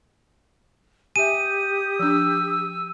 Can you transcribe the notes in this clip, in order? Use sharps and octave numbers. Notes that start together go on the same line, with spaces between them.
G4 E5 G#5 D#6 D#7
F3 D4 E6